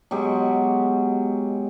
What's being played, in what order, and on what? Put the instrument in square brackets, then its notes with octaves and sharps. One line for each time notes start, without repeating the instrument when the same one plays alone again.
[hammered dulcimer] B2 F#3 G#3 G4